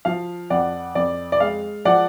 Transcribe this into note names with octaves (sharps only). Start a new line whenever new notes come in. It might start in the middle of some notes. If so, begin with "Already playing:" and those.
F3 F5
F2 D5 F#5
F2 D5
D5
G#3 F5
F3 D5 F#5